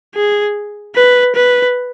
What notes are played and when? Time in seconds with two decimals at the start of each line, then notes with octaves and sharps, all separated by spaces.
0.15 G#4
0.96 B4
1.36 B4